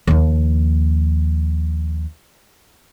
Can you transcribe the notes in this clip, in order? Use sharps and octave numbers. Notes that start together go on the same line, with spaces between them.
D#2 F3